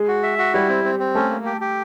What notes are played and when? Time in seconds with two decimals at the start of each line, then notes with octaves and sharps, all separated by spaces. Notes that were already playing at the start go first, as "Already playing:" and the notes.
Already playing: G#3 G#4
0.08 F#4
0.23 E5
0.38 F#4
0.54 G3 E4 G4
0.69 C4
0.85 C4
0.99 C4
1.15 A3 C#4 A4
1.30 A#3
1.45 G4
1.61 G4